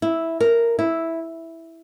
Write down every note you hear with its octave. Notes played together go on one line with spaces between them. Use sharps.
E4
A#4
E4